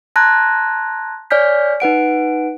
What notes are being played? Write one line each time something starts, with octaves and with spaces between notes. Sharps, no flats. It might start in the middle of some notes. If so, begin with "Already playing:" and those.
A5 A#5 C6 F#6 G#6 A#6
C#5 D5 G#5 F6 G6 B6
D#4 B4 F#5 D7